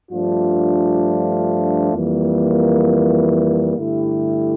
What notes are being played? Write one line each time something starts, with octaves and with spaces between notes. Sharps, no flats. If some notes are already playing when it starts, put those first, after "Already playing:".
G2 F3 A3 D4 F4
F2 E3 G3 A#3
G2 D3 A3 E4 G4